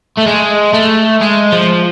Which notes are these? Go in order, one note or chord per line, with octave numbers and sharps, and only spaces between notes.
A3
G#3
A3
G#3
F3